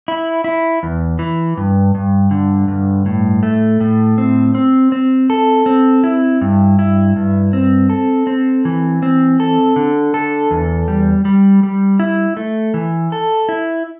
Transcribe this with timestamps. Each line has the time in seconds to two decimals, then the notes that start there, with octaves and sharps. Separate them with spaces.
0.08 E4
0.44 E4
0.83 E2
1.19 E3
1.57 G2
1.95 G2
2.31 D3
2.68 G2
3.06 A2
3.43 A3
3.81 A2
4.18 C4
4.55 C4
4.92 C4
5.30 A4
5.66 C4
6.04 E4
6.41 G2
6.79 E4
7.16 G2
7.53 C4
7.90 A4
8.27 C4
8.65 E3
9.03 C4
9.40 A4
9.76 D3
10.14 A4
10.51 E2
10.88 G3
11.25 G3
11.63 G3
12.00 E4
12.37 A3
12.74 E3
13.12 A4
13.49 E4